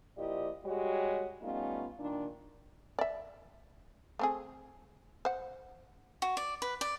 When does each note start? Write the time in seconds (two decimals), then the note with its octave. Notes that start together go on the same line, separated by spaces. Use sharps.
0.17 A#2 F3 E4 G4 D5 D#5
0.64 G3 G#3 F#4 G4 C#5
1.42 G3 A3 B3 C#4 D#4 F4
1.99 A#2 D#3 D4
2.99 D5 E5
4.19 A3 C4 G#4
5.25 C5 F#5
6.22 F#4
6.37 D5
6.62 B4
6.81 D5